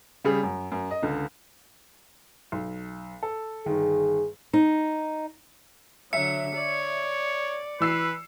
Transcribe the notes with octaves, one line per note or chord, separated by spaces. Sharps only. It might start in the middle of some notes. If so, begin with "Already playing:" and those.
C#3 G3 G#4
F#2
F#2
D#5
C#2 D3
B1
A4
G1 D#3 G#4
D#4
D3 F#3 E5 C#7
C#5 D5
E3 B4 E6 C7